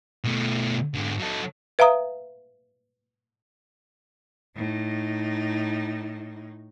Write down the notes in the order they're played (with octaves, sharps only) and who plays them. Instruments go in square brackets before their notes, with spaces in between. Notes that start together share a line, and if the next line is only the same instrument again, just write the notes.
[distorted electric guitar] B2 A3
G#2 D3
F#3 A4
[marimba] B4 E5 F5 A#5 D#6
[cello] A2 D#4